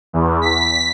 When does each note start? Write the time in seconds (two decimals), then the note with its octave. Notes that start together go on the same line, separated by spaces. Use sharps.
0.13 E2
0.42 B6